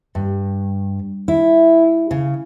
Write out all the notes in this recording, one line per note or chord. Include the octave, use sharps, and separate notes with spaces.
G2
E4
C#3